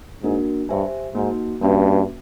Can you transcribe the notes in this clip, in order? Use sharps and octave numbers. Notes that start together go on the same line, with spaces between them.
G#2 A#3 D4 F#4 A#4
G2 G4 C5 E5 G#5
G#2 A#3 D#4 F#4
G2 A#3 C#4 F#4 B4 E5